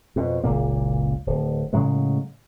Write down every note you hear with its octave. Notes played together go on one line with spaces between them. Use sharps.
F2 B2
F#1 C#2 A#2 A#3
D1
A2 C#3 F#3 G#3